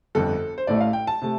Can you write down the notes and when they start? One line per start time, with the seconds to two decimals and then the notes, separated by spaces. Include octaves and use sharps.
0.15 G1 F2 D3 A4
0.58 C5
0.67 A1 A2 A3 D5
0.81 F5
0.93 G5
1.07 A5
1.22 C3 A3